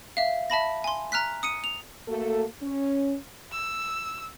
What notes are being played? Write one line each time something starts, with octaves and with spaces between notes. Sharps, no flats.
E5 F5
E5 A5 B5 A#6
G#5 C6
A#5 F6 F#6 B6
D#6 C#7 D#7
F7
A3 A#3 F#4 A4
C#4
E6